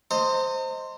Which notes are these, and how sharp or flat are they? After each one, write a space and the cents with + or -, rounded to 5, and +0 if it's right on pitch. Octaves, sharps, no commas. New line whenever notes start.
C5 +0 D#5 +0 A#5 -40